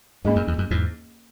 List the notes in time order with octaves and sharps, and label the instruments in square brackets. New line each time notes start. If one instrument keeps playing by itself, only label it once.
[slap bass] G#2 [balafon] A#3 C#4 G#4 D#5
[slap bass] F#2
E2
F#2
E2 G#2